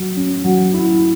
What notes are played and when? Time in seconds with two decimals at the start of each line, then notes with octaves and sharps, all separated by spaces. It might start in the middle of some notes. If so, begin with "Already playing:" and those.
Already playing: F#3
0.16 C#4
0.44 F#3
0.74 E4